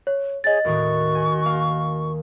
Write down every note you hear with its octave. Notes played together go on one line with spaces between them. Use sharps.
C#5
G#4 C#5 D#5 G#5 A6
D#2 A2 D#3 F#4 C#6
G#5
A#3 F5